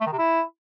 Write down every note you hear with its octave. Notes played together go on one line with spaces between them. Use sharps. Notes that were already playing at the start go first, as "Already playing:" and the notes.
A3
D#3
C3
E4